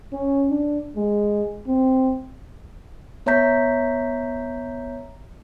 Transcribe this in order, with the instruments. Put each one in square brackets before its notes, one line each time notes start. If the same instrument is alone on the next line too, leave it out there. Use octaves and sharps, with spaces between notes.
[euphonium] C#4
D4
G#3
C4
[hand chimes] B3 C#5 E5 A#5 G6 B6